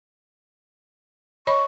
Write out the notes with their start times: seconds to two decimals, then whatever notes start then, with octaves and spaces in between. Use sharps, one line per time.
1.47 C#5 D#5 B5 C#6